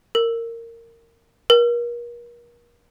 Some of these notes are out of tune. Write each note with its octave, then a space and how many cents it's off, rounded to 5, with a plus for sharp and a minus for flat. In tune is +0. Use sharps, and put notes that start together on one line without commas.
A#4 -20
A#4 +40